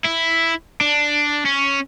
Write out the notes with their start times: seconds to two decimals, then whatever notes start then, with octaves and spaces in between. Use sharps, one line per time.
0.04 E4
0.81 D4
1.45 C#4